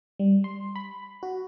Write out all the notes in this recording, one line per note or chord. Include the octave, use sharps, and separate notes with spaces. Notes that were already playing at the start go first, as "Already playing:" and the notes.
G3
C6
B5
F#4